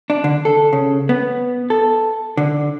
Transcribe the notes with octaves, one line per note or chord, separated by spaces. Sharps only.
D4
D3
A4
C#3
B3
A4
D3